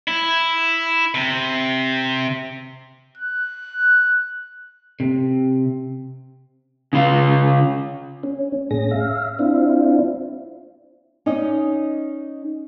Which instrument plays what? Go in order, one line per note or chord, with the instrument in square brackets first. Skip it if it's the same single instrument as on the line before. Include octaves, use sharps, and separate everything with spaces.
[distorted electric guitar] E4
C3
[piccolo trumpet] F#6
[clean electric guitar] C3
[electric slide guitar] C#3 F4
[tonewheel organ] C#4
A2 C#4 G#4 A#6
E5 F5
C4 D4 E4 F4
[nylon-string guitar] C#4 D#4 D5 D#5